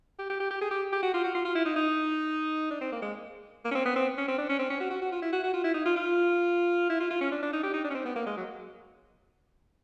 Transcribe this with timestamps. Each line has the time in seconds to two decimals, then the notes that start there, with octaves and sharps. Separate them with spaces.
0.19 G4
0.30 G4
0.40 G4
0.51 G4
0.61 G#4
0.71 G4
0.93 G4
1.03 F#4
1.14 F4
1.24 F#4
1.35 F4
1.45 F4
1.55 E4
1.65 D#4
1.76 D#4
2.71 D4
2.81 C4
2.92 A#3
3.02 G#3
3.65 A#3
3.71 C#4
3.75 C4
3.86 B3
3.96 C4
4.18 C#4
4.28 C4
4.38 D4
4.49 C#4
4.59 C4
4.70 C#4
4.80 F#4
4.90 F#4
5.02 F#4
5.12 F4
5.22 E4
5.33 F#4
5.43 F#4
5.54 F4
5.64 E4
5.74 D#4
5.86 F4
5.96 F4
6.90 E4
7.00 F4
7.11 F4
7.21 C#4
7.32 D4
7.43 D4
7.53 D#4
7.63 G4
7.74 D#4
7.84 D4
7.90 C#4
7.95 C4
8.05 B3
8.16 A#3
8.26 G#3
8.37 F#3